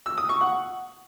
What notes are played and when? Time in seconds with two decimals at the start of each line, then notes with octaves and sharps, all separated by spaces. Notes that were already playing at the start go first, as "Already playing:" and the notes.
0.06 E6
0.18 D#6
0.29 C#6
0.41 F#5